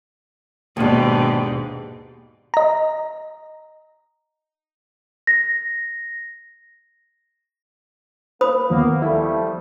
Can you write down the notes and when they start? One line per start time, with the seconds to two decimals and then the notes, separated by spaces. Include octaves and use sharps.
0.77 D#2 G#2 B2 D4 G4
2.54 D#5 A#5
5.27 A#6
8.41 A#3 C5 B5 D#6
8.70 D#2 F3 A#3 B3
9.02 F3 G3 A3 E4